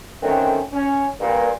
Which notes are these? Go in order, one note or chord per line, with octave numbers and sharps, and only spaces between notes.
D3 D#3 F#3 A3 C4 C#4
C#4
G2 A#2